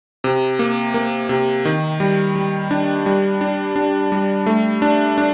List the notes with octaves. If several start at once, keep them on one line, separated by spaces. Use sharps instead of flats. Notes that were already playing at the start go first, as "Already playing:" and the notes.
C3
A#3
A#3
C3
D#3
G3
G3
D4
G3
D4
D4
G3
A3
D4
D4